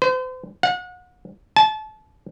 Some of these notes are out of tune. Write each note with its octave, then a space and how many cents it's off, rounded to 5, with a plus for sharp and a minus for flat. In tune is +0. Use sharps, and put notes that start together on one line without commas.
C5 -40
F#5 -35
A5 -30